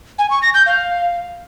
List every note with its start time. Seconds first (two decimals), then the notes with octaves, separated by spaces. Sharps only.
0.18 G#5
0.30 C#6
0.42 A#6
0.54 G6
0.66 F5